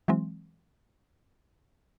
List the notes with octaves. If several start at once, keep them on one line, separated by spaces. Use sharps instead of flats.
E3 F#3 G#3 C4